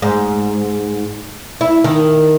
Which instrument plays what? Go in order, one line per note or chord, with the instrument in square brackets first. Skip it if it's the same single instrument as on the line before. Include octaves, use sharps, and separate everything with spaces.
[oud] G#2
E4
D#3